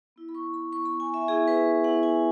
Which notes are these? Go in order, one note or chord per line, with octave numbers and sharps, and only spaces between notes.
B3 E4
B5
C#6
B5
B3 E4 C#6
B5
G#5
E5
B3 E4 G#4
B4
B3 E4 F#5
G#5